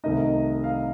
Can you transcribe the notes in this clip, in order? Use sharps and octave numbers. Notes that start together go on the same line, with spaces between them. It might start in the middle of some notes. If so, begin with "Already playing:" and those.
C2 C3 D#3 A3 D#4 D#5
F5